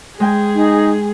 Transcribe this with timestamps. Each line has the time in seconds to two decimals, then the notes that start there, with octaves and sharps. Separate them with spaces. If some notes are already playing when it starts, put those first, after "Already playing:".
0.20 G#3 G#4 G5 G#5
0.55 D#4